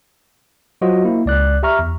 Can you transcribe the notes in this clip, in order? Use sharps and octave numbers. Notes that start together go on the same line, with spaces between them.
F#3 F4 F#4 C5 D#5
A#3 E4
C#2 D5 F#6
G4 E5 A#5 C#6 F6
E2